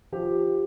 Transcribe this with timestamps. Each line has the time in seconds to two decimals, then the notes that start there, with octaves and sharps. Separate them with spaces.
0.12 F3 G4